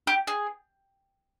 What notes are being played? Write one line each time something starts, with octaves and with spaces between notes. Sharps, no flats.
G4
G#4